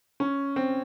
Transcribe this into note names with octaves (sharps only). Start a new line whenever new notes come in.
C#4
C4